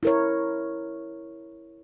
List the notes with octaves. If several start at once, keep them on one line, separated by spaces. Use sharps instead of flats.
E4 A#4 C#5